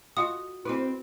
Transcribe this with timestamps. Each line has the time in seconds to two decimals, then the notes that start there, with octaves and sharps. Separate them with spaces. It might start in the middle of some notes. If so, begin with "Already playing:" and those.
0.17 F4 F#4 D#5 F5 D#6
0.65 C4 E4 F#4 A4 B4